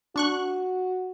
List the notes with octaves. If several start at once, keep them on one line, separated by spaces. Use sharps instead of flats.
D4 F#4 C#6 F#6